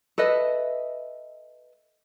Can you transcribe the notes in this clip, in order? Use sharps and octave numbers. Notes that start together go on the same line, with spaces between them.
A4 B4 D#5 E5